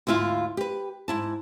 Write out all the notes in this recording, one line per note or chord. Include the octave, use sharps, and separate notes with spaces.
D2 G#2 E4 F4 F5
G4 B4
G#2 E4 A5